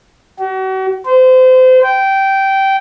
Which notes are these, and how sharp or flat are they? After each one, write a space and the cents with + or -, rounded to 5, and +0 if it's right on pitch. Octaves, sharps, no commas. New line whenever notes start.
F#4 +40
C5 -30
G5 -15